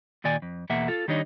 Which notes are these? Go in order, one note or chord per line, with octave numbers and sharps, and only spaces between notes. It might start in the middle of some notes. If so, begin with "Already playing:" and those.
A#2 D#3 D5 G#5
F2
E2 B2 A#3 E5 F#5
F4 A4
D#3 G3 D4 D#4 C#5 D#5